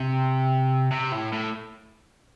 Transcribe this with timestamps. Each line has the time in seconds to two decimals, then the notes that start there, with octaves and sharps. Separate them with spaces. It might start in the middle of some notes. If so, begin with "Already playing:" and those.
Already playing: C3
0.91 C3
1.12 A2
1.32 A2